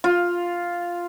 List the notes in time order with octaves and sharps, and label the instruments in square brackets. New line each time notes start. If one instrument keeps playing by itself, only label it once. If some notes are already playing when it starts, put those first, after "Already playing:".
[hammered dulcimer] F4